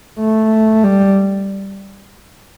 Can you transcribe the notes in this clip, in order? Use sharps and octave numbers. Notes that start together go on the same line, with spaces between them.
A3
G3